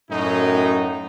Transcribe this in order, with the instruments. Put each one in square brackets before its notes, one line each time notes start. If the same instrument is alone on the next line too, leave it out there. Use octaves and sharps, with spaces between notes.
[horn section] F#2 A2 D#4